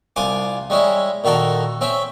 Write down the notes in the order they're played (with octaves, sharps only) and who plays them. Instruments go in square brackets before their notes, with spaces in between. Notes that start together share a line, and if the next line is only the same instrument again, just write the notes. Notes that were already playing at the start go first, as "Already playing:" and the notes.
[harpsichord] C2 F4 G#5 C6 D6
G3 G#3 C#4 E4
A#2 D#3 F#4 A4 A#4
C4 C#4 E5